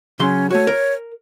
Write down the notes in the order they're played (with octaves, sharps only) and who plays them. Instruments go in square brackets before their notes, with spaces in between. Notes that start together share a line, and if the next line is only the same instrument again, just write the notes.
[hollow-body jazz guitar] C#3 F#3 C6 [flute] C#4
[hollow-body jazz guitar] A3 F#4 [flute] C#5
[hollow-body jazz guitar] A#4